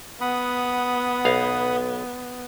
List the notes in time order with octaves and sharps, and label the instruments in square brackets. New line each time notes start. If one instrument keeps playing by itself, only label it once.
[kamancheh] B3 [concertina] F#5 B5 D#6
[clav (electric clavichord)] B1 F5